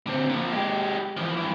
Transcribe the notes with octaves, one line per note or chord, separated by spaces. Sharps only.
D3 C4
A#2 F3
G#3 G4
E3 F3
G2 E3